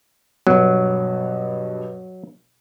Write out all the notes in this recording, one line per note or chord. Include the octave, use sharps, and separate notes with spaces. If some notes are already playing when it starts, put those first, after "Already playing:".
G2 B2 F#3